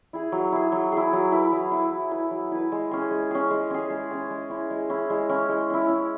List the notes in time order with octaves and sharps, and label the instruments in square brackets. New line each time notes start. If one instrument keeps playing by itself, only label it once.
[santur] E4 G#4
F#3
E4 G#4
F#3
E4 G#4
F#3
E4 B4
F#3
E4 B4
F#3
E4 B4
F#3
E4 B4
G#3
C#4 G#4
G#3
C#4 G#4
G#3
C#4 G#4
G#3
C#4 G#4
G#3
C#4 E4
G#3
C#4 E4
G#3
C#4 E4
G#3
C#4 E4
C#4